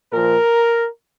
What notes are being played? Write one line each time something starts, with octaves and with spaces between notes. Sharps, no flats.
A#2 F3 A#4